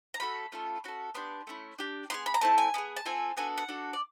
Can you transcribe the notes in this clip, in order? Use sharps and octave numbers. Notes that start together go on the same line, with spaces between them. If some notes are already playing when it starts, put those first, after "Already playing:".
A#5
A3 C#4 F#4 A4 B5
A3 C#4 F4 A4
C#4 F#4 A4
B3 D4 G4 C6
A3 C#4 E4
D4 G4
B3 E4 G#4 C6
B5
A#5
A3 C4 E4 A5
G#5
B3 E4 G#4
A5
C4 F4 A4 G#5
B3 D4 F#4 A4 G#5
F#5
D4 F#4 A4
D5